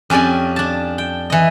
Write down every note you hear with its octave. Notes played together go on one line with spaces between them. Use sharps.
F2 C#4 G4 D5 G#5
D4 A5
G5
E3 D#5